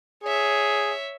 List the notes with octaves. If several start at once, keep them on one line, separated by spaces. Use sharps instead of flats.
G#4 C#5 E5